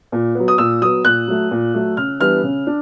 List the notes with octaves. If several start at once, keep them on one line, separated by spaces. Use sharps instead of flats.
A#2
F#3 B3
D#6
A#2 E6
F#3 B3 D#6
A#2 F#6
F#3 A3
A#2
F#3 A3
C#3 F6
E3 G3 B3 D4 F6
C#3
D4